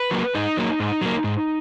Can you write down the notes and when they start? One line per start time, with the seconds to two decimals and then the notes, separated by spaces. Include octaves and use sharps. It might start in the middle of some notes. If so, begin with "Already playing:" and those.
Already playing: B4
0.11 F#3 A#3
0.35 G#2 D#4
0.57 F#3 A#3
0.80 G#2
1.01 F#3 A#3
1.24 G#2